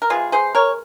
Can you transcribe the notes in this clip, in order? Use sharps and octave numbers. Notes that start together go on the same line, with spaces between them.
A#4
C3 E3 G#3 F4 G#4
G#4 C5
A#4 C#5